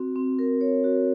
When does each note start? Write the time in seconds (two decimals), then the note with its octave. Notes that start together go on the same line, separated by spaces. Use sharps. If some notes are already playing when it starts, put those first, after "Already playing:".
Already playing: C4 F#4
0.16 C4
0.39 A#4
0.61 C#5
0.84 F#4